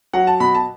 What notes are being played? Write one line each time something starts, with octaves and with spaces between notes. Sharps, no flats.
F#3 F#5
A5
B2 B5
A5